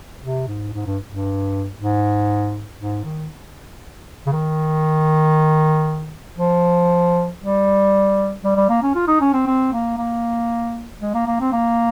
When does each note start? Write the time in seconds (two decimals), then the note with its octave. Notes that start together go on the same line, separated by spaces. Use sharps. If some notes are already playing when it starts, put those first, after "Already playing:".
0.22 C3
0.47 G#2
0.74 G#2
0.86 G2
1.08 G2
1.76 G#2
2.79 G#2
3.04 D#3
4.26 C#3
4.33 D#3
6.38 F3
7.41 G3
8.44 G3
8.56 G3
8.69 A#3
8.83 C#4
8.95 F4
9.08 D#4
9.21 C#4
9.33 C4
9.46 C4
9.72 A#3
9.98 A#3
11.01 G#3
11.14 A#3
11.27 A#3
11.40 C4
11.52 A#3